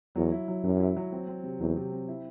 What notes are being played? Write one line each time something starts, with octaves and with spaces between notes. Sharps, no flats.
E2 F#3
E4
F#3
F#2 F#3
E4
F#3
C4
C4
C3
E2 F#3
C3
C4
E4